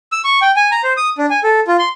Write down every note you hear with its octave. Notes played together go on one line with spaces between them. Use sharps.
E6
C#6
G5
G#5
A#5
C5
D#6
D4
G#5
A4
F4
C6